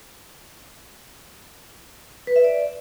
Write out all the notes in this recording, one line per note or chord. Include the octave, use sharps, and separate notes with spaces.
B4
E5
D5